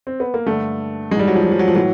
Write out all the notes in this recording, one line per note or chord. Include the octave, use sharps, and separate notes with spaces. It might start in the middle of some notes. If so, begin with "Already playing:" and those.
C4
B3
A#3
G2 D3 A3
G#2 E3 G3 G#3
F#3
F3
F#3
F3
F#3
F3
A2 E3 F#3